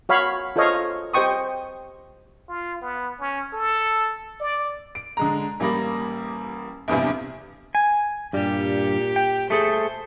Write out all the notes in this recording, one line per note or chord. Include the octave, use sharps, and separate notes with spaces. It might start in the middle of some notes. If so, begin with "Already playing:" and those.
F#4 C#5 F5 B5
F4 A4 C5 C#5 D#5 F5
G4 C5 D#5 G5 C#6 D#6
F4
B3
C#4
A4
D5
D7
D3 G#3 A#5
A1 G3 A#3 B5 A#6
A#1 E2 G2 C3
G#5
G2 A#2 G3 G4
G5
A3 G#4 A4 C5